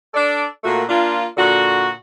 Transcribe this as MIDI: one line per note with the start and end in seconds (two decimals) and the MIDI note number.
0.14 0.45 62
0.14 0.45 69
0.14 0.45 74
0.64 0.83 46
0.64 0.83 57
0.64 0.83 58
0.64 0.83 66
0.89 1.25 58
0.89 1.25 62
0.89 1.25 65
1.37 1.90 46
1.37 1.90 50
1.37 1.90 66